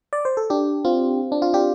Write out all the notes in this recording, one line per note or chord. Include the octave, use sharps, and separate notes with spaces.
D5
C5
A4
D4 G4
C4 F4
D4
F4
D4 G4